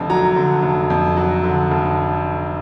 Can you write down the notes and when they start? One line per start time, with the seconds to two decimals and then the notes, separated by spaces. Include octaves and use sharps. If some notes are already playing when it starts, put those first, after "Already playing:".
Already playing: F1 F2 D3
0.10 F#3 A#5
0.36 D3
0.63 F1
0.90 F2
1.17 F#3
1.44 D3
1.71 F1